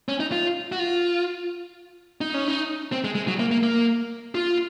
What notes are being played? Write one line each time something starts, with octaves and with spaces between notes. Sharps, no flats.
C#4
D#4
F4
F#4
F4
D#4
C#4
D#4
C4
G#3
G#3
F#3
A#3
A#3
A#3
F4